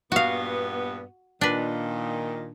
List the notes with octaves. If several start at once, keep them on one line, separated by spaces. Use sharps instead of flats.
G2 A#2 B3 F#4 F5
A#2 D#3 D4 B4